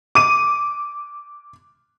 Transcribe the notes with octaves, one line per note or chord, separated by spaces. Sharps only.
D6 D#7